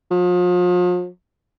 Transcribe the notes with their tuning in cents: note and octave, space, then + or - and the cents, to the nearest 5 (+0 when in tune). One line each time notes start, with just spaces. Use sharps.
F3 +40